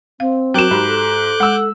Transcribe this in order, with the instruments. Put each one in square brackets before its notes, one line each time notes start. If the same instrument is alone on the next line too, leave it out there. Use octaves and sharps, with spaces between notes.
[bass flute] C4 [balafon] F5
[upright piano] F#3 E7 [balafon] F#4 A#4 G5 [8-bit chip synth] D6 F#6 G6
[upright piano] G#2 [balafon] G4 B5
[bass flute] A4
[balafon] G#3 [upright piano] F#5 E6